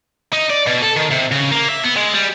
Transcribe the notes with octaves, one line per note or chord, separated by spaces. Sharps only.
D#4
D5
B2
A4
D#3
C3
C#3
A#3
E5
B3
G#3
G3